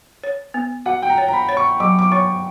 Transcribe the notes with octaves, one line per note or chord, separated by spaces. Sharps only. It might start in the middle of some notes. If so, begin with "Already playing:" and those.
C#5
B3
F#4 F#5
G5
A#5
C#5
A#5
B5
C#5
C#6
F#3 D6
D6
C#5 C#6